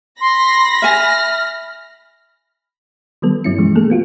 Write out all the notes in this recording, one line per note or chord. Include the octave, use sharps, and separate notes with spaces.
B5 C6 A#6
E5 G#5 F6
D#3 F#3 G3 B3 A4
G2 F#3 C#4 E4 C#7
B2 E3 F3 G#3
A3 A#3 G#4 A4
B3 F4 F#4